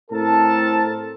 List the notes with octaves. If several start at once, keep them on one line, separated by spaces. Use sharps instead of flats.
A2 C4 A4 A#4 A5